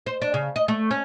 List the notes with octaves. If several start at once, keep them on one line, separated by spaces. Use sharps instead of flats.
C5
D4
C#3
D#5
A3
C#4